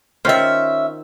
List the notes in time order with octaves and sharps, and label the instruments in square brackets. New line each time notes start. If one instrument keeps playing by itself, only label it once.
[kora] D#3 F4 C5 [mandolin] C#4 E5